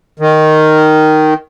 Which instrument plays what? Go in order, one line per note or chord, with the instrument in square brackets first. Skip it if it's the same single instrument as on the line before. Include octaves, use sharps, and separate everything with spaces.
[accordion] D#3